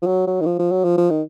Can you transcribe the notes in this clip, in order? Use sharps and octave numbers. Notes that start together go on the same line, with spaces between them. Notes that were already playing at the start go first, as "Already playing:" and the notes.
F3
F#3
F#3
D#3
F3
F3
F#3
F3
F3
D#3